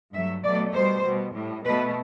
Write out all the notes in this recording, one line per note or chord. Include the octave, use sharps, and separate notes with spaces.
G2 F#3 A3 E5
B2 F#3 A3 D5
B2 G3 C5
B2 G3
A2 G3
B2 A3 B4